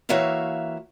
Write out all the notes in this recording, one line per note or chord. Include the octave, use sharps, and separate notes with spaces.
E3 A#3 F#4 C#5 E5 F5